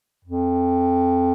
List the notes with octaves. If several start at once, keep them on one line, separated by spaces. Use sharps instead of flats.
F2